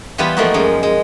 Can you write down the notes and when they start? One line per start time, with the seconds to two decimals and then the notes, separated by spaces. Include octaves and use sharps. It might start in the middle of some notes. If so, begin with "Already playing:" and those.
0.18 E3 G3 B3 F4 G4 B4
0.37 F3 A3 A#3 D#4 F#4
0.54 F#2 F3 G#3
0.83 G#3